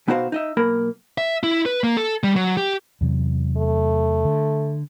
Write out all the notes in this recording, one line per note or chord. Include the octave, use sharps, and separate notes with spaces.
B2 B3 D#4 F#4 C5 F5
D#4 D#5 E5
B1 A#3 A#4 B5
E5
E4
B4
A#3
A4
G3
F#3
G4
E2 C3 F#3
A3
D3